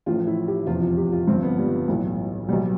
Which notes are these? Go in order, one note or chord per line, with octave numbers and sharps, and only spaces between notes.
A1 A2 F3 F4
E4
G4
F1 E2 C3 F3 F4
F4
G4
F4
G1 G2 F3 C4
B3
G3
B1 A2 E3
B1 B2 G3